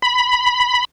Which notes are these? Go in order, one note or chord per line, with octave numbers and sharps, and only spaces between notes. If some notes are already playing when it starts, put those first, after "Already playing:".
B5